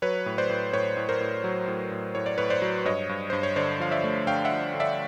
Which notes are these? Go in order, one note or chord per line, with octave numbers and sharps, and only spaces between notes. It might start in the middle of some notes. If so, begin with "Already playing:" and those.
F#3 B4 C#5
A2
C5 D5
A2
A2 B4 C#5
A2
A#4 C5
A2
F#3
A2
A2
A2 C#5
D5
A2 B4 C#5
C5 D5
F#3
G2 C#5 D#5
G2
G2 C5
C#5
D3 C5 D5
F3 F5
D5 E5
A3
D3 F5 G5
E5 F#5
F3
D3
D5 E5